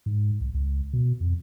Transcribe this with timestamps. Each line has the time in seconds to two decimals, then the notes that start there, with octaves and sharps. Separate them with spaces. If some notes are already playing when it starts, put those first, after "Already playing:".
0.06 G#2
0.41 C2
0.54 C#2
0.93 B2
1.21 F2